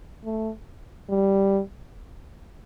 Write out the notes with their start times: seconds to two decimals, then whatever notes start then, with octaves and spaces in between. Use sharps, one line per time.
0.24 A3
1.10 G3